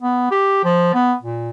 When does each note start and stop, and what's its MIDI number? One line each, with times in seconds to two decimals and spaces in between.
0.02 0.29 59
0.31 0.61 67
0.64 0.94 53
0.94 1.15 59
1.22 1.50 46